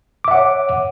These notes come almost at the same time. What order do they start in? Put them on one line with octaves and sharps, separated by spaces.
D6 E5 F#5 C#5